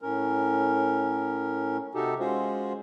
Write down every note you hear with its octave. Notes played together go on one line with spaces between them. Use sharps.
A2 C#4 A#4
C3 D#4 F#4 G4 A4
G#3 C#4 F4 F#4 C5